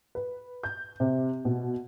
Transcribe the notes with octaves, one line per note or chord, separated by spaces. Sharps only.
B4
G6
C3
B2